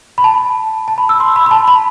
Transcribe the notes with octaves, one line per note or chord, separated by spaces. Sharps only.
B5
A5
A5
B5
E6
C6
B5
B5
A5
B5